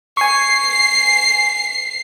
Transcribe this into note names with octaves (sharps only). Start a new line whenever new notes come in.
G#5 C#6 C7